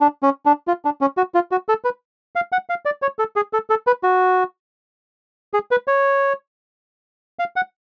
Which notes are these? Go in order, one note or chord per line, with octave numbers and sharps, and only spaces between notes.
D4
C#4
D4
F4
D4
C#4
F#4
F4
F#4
A4
B4
F5
F#5
F5
D5
C#5
A4
G#4
A4
A4
B4
F#4
G#4
B4
C#5
F5
F#5